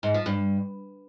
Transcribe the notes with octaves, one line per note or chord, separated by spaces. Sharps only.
G#2
F3
G2